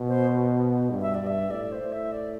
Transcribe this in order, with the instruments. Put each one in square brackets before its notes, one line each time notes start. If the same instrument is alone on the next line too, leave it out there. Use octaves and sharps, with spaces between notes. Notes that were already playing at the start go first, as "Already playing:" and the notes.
Already playing: [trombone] B2
[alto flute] C5
[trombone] G2
[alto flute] E5
D5
[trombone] G2
[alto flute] E5
[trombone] A2 [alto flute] D5
[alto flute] C5
[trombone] A2
[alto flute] E5
D5